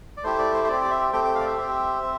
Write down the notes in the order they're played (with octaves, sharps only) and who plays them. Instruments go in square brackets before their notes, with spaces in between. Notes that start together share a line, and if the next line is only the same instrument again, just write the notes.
[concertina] D5
A3 E4 G4 C5
D5
C5
C5
C4 D5
G4
D5
E5
A3 C4 G4 G5
G5
F5
D5
E5
C4 G4
C4